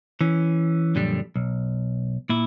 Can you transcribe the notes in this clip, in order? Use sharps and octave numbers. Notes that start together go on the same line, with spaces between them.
E3 C#4
F#2 A#2 D3 F3 G3 D4
B1
A#2 E4